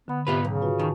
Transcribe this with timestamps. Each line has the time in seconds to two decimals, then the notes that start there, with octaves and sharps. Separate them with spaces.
0.08 D3 B3 B5
0.27 G#2 C3 B3 F4 B4
0.44 B1 C#3
0.62 F4 F#4 B4
0.80 D#3 G#5 A5 C#6